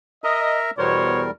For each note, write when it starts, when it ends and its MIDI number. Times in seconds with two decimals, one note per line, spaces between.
0.24 0.71 70
0.24 0.58 75
0.24 0.71 76
0.24 0.71 82
0.78 1.31 40
0.78 1.22 47
0.78 1.31 55
0.78 1.31 70
0.78 1.22 72
0.78 1.22 73